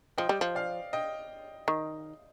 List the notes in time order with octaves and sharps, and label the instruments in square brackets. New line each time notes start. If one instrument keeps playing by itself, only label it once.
[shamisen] F3 [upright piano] D#5 G5
[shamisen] G3
F3
[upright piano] D5 F5
D#5 G5
[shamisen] D#3